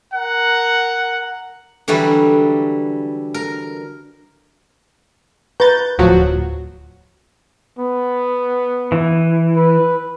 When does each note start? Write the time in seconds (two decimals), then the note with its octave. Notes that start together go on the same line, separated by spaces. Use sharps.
0.14 A#4 F#5
1.88 D3 E3 F#3 G3
3.34 A#4
5.60 B4 A#5 C#6 G6 A6
5.99 D1 F3 F#3 F#4
7.79 B3
8.92 E3
9.56 B4